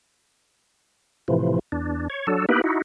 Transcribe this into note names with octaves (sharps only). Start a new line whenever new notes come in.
A2 C3 E3 F3
E2 D4
C#5
F#3 D4 A4
A#3 B3 D#4 E4 G4 B4
D#4 E4 F#4